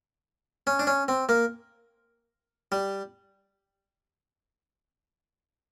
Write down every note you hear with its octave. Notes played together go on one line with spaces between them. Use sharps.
C#4
D4
C#4
C4
A#3
G3